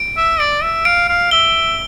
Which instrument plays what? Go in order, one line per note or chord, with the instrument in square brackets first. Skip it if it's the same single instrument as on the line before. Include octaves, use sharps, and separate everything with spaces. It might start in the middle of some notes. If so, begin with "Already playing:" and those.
Already playing: [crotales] D7
[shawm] E5
[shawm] D5 [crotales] D7
[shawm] E5
[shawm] F5 [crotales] D7
[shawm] F5
[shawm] E5 [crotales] G7